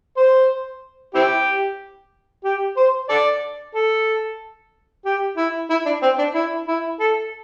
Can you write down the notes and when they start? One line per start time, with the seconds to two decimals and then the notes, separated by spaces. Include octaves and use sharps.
0.17 C5
1.15 C4 E4 G4
2.45 G4
2.77 C5
3.09 A4 D5
3.75 A4
5.05 G4
5.37 E4
5.70 E4
5.86 D4
6.02 C4
6.18 D4
6.34 E4
6.67 E4
7.00 A4